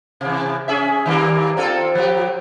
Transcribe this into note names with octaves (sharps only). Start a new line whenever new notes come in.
C3 E3
C#4 G#4 E5
D#3 G3 A#3
C4 F4 A4
F3 G4